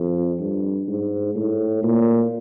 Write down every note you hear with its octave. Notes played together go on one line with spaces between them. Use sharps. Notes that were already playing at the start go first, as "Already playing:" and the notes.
Already playing: F2
G2
G#2
A2
A#2